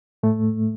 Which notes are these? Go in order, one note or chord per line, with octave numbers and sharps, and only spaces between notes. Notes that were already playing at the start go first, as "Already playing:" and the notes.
A2 A3